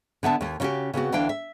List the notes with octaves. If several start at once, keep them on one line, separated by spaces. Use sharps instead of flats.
D3 B3 E5 A5
D#2 A#3
C#3 B3 C#4 F#4 G4
C#3 B3 C4 F#4
D2 E3 D4 F5 G5
E5